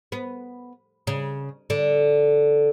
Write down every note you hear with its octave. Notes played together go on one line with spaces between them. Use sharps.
B3
C#3
D3